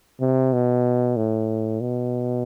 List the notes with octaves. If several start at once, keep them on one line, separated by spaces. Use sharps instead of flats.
C3
B2
A2
B2